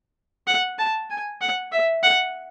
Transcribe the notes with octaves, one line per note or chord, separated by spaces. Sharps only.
F#5
A5
G#5
F#5
E5
F#5